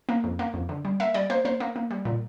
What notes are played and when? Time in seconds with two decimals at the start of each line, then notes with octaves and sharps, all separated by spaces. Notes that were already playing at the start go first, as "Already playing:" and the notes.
0.09 A#3
0.24 F2
0.39 A#3
0.54 F2
0.69 D3
0.85 G3
1.00 A#3 E5
1.14 G3 D5
1.30 A#3 C5
1.45 A#3 C5
1.60 A#3
1.76 A#3
1.91 G3
2.05 A#2